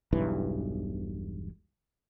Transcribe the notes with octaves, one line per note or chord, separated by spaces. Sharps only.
E1 B1 G2 E3